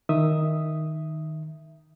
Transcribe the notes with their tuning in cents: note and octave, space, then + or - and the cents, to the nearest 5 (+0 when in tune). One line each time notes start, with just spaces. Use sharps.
D#3 +0 E5 +0 D#6 +0